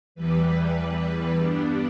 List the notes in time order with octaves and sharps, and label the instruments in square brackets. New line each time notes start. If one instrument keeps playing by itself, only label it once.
[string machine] E2 E3 G3 B4
G2 G3 B3 D4